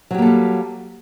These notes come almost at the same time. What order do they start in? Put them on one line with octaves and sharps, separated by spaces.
F#3 G4 A#3 A4 G3